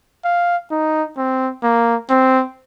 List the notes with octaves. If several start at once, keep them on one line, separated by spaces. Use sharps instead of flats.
F5
D#4
C4
A#3
C4